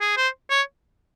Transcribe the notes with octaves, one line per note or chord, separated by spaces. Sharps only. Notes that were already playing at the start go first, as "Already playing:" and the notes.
G#4
C5
C#5